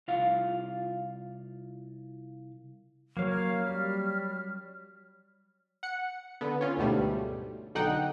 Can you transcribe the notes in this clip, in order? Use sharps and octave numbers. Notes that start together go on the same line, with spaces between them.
C2 F4 F5
F#3 A#3 C#5 F5
F6
G3
F#5 C#7
D3 B3
C#4 F4
D2 G#2 B2 G3 A3
B1 D3 D#4 F#5 G5